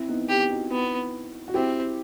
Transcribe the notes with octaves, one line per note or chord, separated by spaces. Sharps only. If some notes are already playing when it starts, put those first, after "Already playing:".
Already playing: C4 E4
B3 D#4
B3 G4
D#4 F#4
B3
F#4
C4 E4 G4